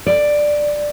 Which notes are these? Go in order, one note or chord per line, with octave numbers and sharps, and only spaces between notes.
D5